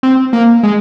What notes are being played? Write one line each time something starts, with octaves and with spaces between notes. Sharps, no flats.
C4
A#3
G#3